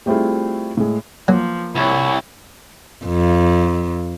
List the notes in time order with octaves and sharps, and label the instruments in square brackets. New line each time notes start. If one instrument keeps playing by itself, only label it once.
[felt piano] G3 A3 C4 E4 F4 G#4
A2 G#3
[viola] F3 [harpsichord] F#3 [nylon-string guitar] A#3
[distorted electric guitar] C2 [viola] E4 C#5
[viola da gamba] F2